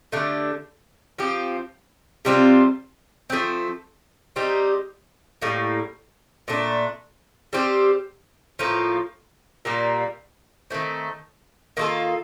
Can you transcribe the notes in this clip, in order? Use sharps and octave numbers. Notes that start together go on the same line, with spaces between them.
D3 A3 D4 G4
F3 C4 G4
C3 G3 C4 F4
F3 A3 C4
G3 C4 D#4 G4
A2 G3 A#3
A#2 A3 D4
G3 C4 G4
A2 F3 A#3 F4
A#2 G3 A#3
D#3 A3 C4
D#3 A#3 F4 A4